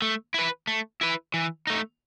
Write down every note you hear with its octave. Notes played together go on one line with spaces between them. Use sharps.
A3
E4 B4
A3
E4 B4
E3
A3 D#4